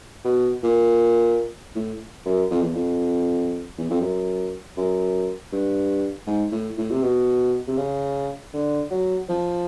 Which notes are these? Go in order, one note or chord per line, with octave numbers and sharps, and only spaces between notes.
B2
A#2
A2
F#2
F2
E2
F2
E2
F2
F#2
F#2
G2
G#2
A2
A2
C3
B2
C3
C#3
D3
F#3
F3